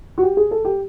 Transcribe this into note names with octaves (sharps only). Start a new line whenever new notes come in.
F#4
G4
G#4
A4
G4